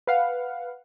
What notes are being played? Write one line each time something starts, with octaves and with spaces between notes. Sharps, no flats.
B4 F5 F#5